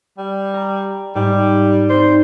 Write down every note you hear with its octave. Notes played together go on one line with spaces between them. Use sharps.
G3
A#5
G#2 G3
C4 D#4 C5 D5